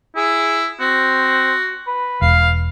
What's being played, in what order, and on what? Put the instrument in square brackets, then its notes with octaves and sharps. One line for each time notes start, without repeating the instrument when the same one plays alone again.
[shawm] E4 [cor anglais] G#4
[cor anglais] C4 [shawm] F#4
[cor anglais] B4
[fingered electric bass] E1 [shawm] F5